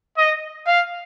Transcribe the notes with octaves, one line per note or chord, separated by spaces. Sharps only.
D#5
F5